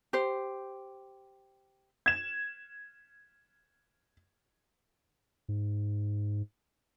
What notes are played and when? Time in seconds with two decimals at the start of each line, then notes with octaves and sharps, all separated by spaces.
0.13 G4 C5
2.06 G#6 E7
5.49 G#2